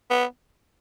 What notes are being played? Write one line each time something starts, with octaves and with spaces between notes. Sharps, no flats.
B3